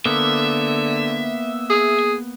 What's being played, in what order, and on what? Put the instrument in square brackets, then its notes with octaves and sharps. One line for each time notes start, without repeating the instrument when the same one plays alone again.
[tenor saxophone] D3 [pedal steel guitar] A#3 B3 [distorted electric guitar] E5
[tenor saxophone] G#4